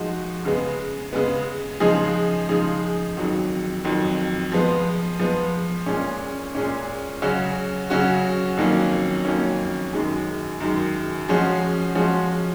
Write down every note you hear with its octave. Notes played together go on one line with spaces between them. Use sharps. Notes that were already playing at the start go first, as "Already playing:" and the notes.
Already playing: F3 G#3 D#4 F#4
C#3 G#3 B3
C#3 G#3 B3
C#3 F3 G#3 D#4 G#4
C#3 F3 G#3 D#4 G#4
F2 D#3 F#3
F2 D#3 F#3
F3 G#3 B3
F3 G#3 B3
A#2 G#3 C#4
A#2 G#3 C#4
C#3 F#3 C#4 F#4
C#3 F#3 C#4 F#4
F2 D#3 F#3 A#3 C#4
F2 D#3 F#3 A#3 C#4
F#2 D#3 G#3
F#2 D#3 G#3
F3 G#3 C#4 F#4
F3 G#3 C#4 F#4